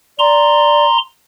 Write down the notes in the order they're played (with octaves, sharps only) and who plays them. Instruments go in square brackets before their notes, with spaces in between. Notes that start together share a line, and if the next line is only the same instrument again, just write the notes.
[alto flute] D5 [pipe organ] A#5 C6